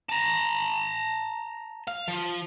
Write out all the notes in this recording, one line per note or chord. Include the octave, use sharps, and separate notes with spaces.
A5 A#5
F5
F3